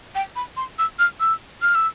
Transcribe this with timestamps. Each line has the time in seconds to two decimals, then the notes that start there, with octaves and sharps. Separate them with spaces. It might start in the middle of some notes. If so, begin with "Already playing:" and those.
0.15 G5
0.36 B5
0.57 C6
0.79 E6
0.99 F6
1.20 E6
1.62 F6
1.75 E6